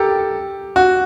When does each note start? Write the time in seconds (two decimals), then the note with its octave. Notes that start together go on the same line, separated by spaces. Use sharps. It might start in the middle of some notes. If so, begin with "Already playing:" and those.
Already playing: G4 A4 A#4
0.76 F#4